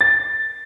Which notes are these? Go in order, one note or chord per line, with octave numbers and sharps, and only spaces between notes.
A6